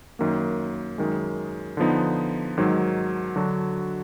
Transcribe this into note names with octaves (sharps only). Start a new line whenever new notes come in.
F#2 D#3 A#3
F#2 D#3 G#3
D3 F3 B3 D#4
G#2 D#3 F#3
D3 F#3 D4 F#4